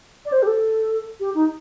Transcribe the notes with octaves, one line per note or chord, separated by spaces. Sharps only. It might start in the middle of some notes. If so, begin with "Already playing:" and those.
D5
C5
G4
A4
G4
D#4